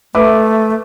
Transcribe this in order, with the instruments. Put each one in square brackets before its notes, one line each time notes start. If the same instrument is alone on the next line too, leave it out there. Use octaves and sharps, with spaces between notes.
[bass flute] A3 [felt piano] B4 E5 D6